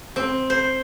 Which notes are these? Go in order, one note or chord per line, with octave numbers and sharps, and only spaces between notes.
C4
C5